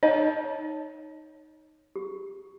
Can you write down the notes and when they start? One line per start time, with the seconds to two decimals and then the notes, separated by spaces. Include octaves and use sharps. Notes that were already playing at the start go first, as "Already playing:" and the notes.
0.03 D#4 C#5 D#5 A5
1.96 G4